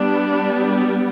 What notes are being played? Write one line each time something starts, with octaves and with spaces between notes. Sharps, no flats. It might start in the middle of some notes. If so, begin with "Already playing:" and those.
Already playing: G3 B3 D4